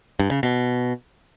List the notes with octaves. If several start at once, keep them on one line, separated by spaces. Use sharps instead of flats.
G2
C#3
B2